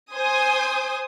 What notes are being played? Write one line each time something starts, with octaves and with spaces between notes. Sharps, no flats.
C5 G#5 D#6